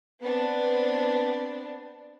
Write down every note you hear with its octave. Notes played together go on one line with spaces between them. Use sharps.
B3 C4 D4